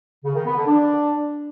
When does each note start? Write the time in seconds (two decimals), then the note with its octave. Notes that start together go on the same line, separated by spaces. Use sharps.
0.25 C#3
0.35 D#3
0.46 B3
0.56 D3
0.67 D4